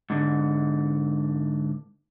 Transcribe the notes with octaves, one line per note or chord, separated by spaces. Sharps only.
G#2 D3